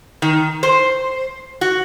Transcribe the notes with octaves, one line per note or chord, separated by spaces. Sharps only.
D#3
C5
F#4